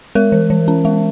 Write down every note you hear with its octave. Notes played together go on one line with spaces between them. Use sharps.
G#3 A#4
E3
E3
C#4
G#3